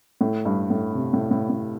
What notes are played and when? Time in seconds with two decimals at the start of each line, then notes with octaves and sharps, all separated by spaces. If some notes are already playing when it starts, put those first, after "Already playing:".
0.21 A2
0.45 G2
0.70 A2
0.95 C3
1.13 A2
1.31 A2
1.50 A2